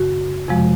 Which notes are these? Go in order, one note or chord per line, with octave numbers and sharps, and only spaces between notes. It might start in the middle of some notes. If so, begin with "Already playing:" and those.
Already playing: F#2 C#3 F#4
F2 C3 F3 G#3